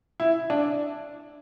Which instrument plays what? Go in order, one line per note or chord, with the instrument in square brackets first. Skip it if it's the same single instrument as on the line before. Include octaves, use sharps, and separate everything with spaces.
[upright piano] E4
D4